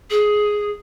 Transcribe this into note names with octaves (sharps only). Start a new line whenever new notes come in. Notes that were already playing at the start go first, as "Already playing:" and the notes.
G#4